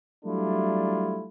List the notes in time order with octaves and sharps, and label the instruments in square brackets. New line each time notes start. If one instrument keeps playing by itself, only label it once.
[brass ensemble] F#3 G3 A3 D4 E4 F4